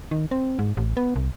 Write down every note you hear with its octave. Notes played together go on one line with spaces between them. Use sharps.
D#3
C4
G#2
A1
B3
C2